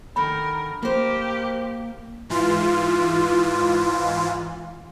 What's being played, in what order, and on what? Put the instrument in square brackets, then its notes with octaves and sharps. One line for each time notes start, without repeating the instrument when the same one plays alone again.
[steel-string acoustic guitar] D3 D#3 D#4 [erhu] A#4 [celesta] B5
[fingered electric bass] A#3 [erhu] G4 [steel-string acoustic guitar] A#4 C5
[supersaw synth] G#2 E3 F4